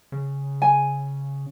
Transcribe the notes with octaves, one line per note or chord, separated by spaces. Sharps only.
C#3
G#5